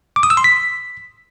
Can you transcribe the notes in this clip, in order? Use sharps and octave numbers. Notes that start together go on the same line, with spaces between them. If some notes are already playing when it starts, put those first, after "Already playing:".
D6
D#6
E6
C6
B6